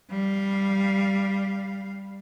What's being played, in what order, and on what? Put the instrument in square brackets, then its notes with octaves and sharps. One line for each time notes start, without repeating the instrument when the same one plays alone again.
[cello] G3 F5